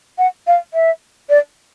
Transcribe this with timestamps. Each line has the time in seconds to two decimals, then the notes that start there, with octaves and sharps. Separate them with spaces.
0.18 F#5
0.47 F5
0.74 E5
1.30 D5